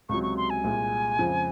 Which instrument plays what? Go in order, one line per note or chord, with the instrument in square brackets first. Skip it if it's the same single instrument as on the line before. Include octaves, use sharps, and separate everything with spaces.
[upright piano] C#2 C3 F#3 [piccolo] C#6
[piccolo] C#6
C6
G#5
[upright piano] C2 A#2 G#3
F2 C#3 F3 G#3